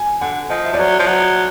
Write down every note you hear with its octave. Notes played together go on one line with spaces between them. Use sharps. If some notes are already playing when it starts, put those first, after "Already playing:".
Already playing: G#5
D3 F#5
F3 D#5
E5
F3 D5
F#3 C#5
F3
F#3